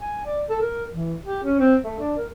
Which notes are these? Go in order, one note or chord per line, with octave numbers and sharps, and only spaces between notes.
G#5
D5
A4
A#4
E3
G4
C#4
C4
A3
D4
A#4